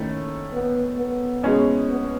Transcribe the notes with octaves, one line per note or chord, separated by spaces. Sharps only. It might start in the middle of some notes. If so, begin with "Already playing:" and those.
Already playing: D#3 A3 C#4 E4
B3
B3
B2 G#3 C#4 E4
B3